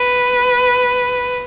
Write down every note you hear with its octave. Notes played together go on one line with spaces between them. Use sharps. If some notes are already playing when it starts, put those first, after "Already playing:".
Already playing: B4